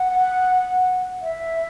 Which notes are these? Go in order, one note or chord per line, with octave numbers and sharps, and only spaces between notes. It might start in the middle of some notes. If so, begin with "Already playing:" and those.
Already playing: F#5
E5